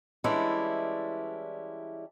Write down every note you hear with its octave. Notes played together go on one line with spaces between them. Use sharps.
E3 G3 G#3 C#4 D4 E4